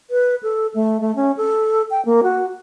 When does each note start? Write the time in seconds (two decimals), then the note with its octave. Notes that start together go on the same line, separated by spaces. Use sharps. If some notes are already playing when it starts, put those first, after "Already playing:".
0.10 B4
0.43 A4
0.75 A3
1.01 A3
1.16 C#4
1.37 A4
1.91 G5
2.06 A#3
2.23 F#4